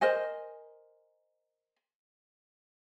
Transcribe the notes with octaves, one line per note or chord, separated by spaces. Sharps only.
A#4 C5 D#5 G#5